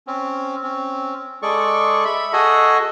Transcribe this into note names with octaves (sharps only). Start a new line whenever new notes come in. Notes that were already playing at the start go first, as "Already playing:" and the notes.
C4 C#4
C4 C#4
G#3 G#4 A4 D5 C#6
E5 B5
F#4 G#4 A4 D#5